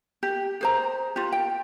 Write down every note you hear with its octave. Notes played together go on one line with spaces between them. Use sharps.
G4
G#4 C5 A#5
F4 G4
G5